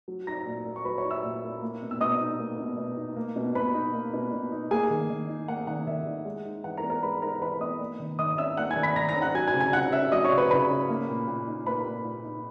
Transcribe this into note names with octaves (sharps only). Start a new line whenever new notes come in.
F#3
D#4 A#5 A#6
A#2
A#3
C#6
F#3 B4 B5
C#5 C#6
D#4
E5 E6
A#2
A#3
A#3
B2
E6
B2 D#5 D#6
D#4
A#3
B2
B2
D#4
A#3
B2
B2 B4 B5
D#4
A#3
B2
B2
D#4
A#3 G#4 G#5
D#3
D#3
D#4
A#3 F#5
D#3 F#5
D#3 E5
D#4
G#3
D#4
E3 F#5
A#4 A#5
B3
A#4 A#5
G#3 B4 B5
D#4 A#4 A#5
E3 B4 B5
B3 D#5 D#6
A#3
D#3
D#3 D#5 D#6
C#4 E5 E6
A#3 F#5 F#6
G#5 G#6
D#3
B5 B6
D#3 A#5 A#6
A#5 A#6
C#4
F#5 F#6
F#3 G#5 G#6
G#5 G#6
C#3
G#5 G#6
C#3 F#5 F#6
C#4 E5 E6
F#3 D#5 D#6
C#5 C#6
C#3
B4 B5
C#3 B4 B5
C#4
A#3
A#2
A#2
D#4
A#3 B4 B5
A#2
A#2
D#4